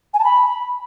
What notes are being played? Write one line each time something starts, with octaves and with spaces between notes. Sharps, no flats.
G#5
A5
B5